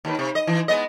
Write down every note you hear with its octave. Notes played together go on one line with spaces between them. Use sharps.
D#2 D#3 B4
C3
D#5
E3
G#3 B3 D#5